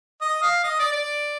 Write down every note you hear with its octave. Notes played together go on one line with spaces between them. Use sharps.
D#5
F5
D#5
D5
D5